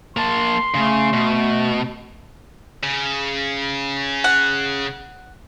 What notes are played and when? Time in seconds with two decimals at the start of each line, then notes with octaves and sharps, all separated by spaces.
0.17 A#3 A5 C6
0.74 C#3 A3
1.13 B2
2.83 C#3
4.24 F#5